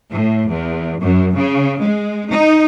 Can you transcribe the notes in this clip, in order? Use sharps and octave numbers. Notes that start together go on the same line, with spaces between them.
A2
E2
F#2
C#3
G#3
D#4